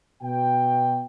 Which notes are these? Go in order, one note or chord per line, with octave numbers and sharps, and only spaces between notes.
B2 G5